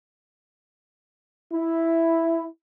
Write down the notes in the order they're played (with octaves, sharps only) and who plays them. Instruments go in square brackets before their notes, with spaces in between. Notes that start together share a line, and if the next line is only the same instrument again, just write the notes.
[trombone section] E4